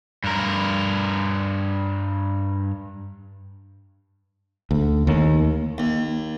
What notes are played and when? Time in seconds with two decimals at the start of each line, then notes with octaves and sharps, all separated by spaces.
0.24 G2 A#4
4.71 D2
5.07 D#2
5.78 D#2